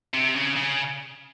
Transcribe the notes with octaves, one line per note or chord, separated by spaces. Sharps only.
C3
C#3
C#3